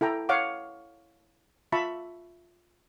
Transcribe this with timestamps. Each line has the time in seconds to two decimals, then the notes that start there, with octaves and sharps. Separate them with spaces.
0.01 E4 A4 G5 A#5
0.29 C#5 F5 F#5 D6
1.72 F4 E5 A5 B5 C#6